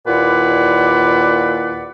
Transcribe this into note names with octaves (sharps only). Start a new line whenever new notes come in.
D#2 A#2 E4 B4 D5 F#5